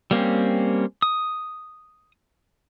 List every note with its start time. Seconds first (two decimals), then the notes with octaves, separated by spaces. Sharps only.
0.11 G3 A#3 C4 C#4
1.02 D#6